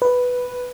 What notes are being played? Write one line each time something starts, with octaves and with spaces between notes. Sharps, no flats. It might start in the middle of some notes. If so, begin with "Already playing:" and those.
B4